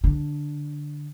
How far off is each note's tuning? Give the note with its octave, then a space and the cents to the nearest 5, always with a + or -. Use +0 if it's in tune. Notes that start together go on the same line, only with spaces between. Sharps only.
D3 +0 D4 +0